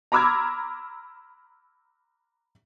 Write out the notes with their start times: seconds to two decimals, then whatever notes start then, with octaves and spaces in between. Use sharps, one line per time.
0.12 A#5 B5 D6 E6 F6 G#6